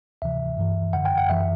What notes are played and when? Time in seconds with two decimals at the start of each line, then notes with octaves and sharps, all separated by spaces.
0.22 D2 C3 E3 E5
0.57 G2 E3
0.93 F#2 D3 F#5
1.05 G5
1.18 F#5
1.29 F#2 E3 E5